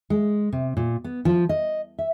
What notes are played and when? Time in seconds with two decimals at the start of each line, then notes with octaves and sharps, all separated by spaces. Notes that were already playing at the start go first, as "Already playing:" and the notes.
0.10 G#3
0.53 C3
0.77 A#2
1.04 B3
1.25 F3
1.49 D#5
1.99 E5